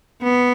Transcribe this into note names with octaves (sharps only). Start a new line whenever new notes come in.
B3